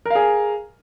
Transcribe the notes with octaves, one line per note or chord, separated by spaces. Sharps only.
G#4 A#4 F5